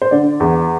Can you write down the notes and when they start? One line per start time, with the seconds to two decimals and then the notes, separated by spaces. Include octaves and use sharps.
0.02 C5
0.11 D3 D5
0.40 E2